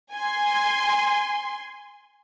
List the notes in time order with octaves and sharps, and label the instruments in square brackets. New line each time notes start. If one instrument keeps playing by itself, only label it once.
[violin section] G#5 C6